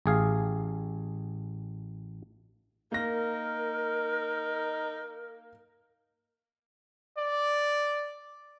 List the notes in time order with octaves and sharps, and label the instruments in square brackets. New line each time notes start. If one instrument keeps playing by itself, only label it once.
[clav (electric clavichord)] A1 G#4 F5
[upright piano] A#3 A#6 [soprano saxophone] D#4 [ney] A#4
[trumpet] D5